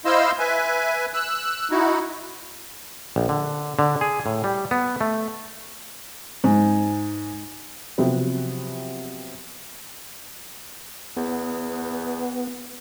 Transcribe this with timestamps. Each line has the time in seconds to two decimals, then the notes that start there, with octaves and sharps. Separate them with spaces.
0.05 E4 C5 D#5 F5 C6 E6
0.39 B4 E5 G#5
1.14 E6 F#6
1.71 D#4 E4 F#4
3.16 A#1
3.29 D3
3.79 D3
4.01 G#4
4.26 A2
4.44 G3
4.71 B3
5.01 A3
6.44 G#2
7.98 C3 F3 F#3 B3 C4
11.17 E2 B3